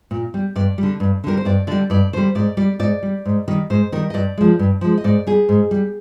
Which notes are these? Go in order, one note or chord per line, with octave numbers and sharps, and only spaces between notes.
A#2
G3
G2 D5
D3 G3
G2
D3 G3 A#4
C5
G2 D5
D3 G3 D5
G2 D5
D3 G3 C5
G#2 D5
G3 D5
G#2 D5
G3
G#2
D#3 G3
G#2 C5
D#3 G3 A#4
D#5
G2 D5
F3 G#3
G2
F3 G#3
D#5
G#2 D5
G3 G#4
G#2
G3